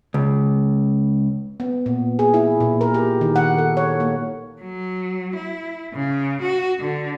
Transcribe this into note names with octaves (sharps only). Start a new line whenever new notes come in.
C#2
B3
A#2
G#4
E4
A#2
A#4
G4
D#3
F#5
A4
C#5
A#3
F#3
E4
C#3
F#4
D3